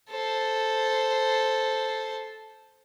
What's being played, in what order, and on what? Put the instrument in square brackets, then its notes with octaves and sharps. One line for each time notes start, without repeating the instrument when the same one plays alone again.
[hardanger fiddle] A4 C5